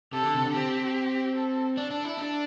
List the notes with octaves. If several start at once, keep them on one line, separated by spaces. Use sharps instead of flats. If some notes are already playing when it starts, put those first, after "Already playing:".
C3 A4
D3
C3
D3
C4 G4
A4
D4 A4
D4
E4
D4